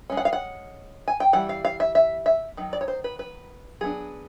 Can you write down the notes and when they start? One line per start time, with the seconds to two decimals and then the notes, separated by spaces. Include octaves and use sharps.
0.10 G#3 C#4
0.17 F#5
0.25 F5
0.33 F#5
1.08 G#5
1.20 G5
1.33 E3 G3 F#5
1.49 F5
1.65 F5
1.80 E5
1.95 E5
2.26 E5
2.57 D#3 F#3
2.73 D5
2.81 C#5
2.88 C5
3.04 B4
3.19 B4
3.81 F#3 B3 D4 G#4